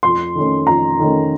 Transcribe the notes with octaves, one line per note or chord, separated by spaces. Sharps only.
F2 C6
D#3 A3 C#4
F2 A#5
D#3 A3 C#4